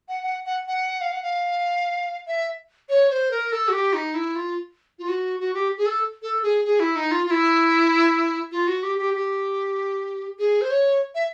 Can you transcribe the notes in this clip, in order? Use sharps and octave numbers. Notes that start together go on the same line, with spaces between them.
F#5
F#5
F#5
F#5
F5
F#5
F5
E5
C#5
C5
A#4
A4
F#4
G4
D#4
E4
F4
F4
F#4
F#4
G4
G#4
A4
A4
G#4
G#4
E4
D#4
F4
F4
E4
F4
F#4
G4
G4
G4
G#4
C5
C#5
E5